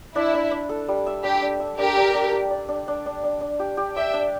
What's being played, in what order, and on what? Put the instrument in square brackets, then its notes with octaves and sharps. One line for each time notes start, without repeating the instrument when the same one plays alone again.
[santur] D4 [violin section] E4
[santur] D4
D4
A4
G3
E5
[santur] D4 [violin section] G4
[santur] D4
E5
[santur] D4 [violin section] G4 A#4
[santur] D4
D4
G4
D5
D4
D4
D4
D4
D4
G4
G4
[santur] D5 [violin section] E5 G5
[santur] D4